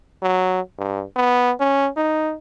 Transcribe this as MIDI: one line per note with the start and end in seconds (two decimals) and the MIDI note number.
0.22 0.61 54
0.78 1.04 43
1.16 1.53 59
1.60 1.89 61
1.97 2.35 63